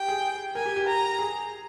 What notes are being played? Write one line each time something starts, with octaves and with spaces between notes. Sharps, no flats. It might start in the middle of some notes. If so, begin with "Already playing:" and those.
Already playing: G4 G5
G#4
A#4 G#5
G4
G4
A#5
G#4